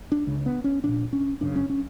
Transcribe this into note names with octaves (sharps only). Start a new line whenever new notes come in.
D4
C#2 C#3
B3
C#4
A#1 A#2 D4
C#4
G1 F#2 C#3 D4
C#4
C#4